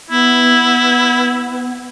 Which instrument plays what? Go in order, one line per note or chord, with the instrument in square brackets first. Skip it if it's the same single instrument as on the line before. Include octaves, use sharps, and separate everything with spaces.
[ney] B3 [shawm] E4